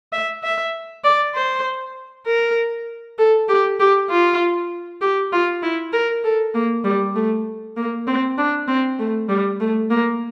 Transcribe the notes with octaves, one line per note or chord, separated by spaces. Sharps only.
E5
E5
D5
C5
A#4
A4
G4
G4
F4
G4
F4
E4
A#4
A4
A#3
G3
A3
A#3
C4
D4
C4
A3
G3
A3
A#3